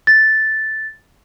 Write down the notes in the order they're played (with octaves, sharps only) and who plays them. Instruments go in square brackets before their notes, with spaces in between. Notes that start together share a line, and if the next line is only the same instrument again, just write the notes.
[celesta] A6